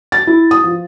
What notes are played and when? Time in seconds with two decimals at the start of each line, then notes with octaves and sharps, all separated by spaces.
0.12 A6
0.27 E4
0.51 D#6
0.64 F3